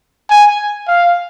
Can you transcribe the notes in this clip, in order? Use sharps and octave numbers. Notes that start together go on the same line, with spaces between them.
G#5
F5